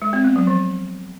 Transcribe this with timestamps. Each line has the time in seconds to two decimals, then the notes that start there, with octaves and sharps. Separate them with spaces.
0.02 G#3
0.13 C4
0.24 B3
0.36 F#3
0.47 F3